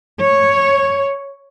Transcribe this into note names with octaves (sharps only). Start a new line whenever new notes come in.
C#5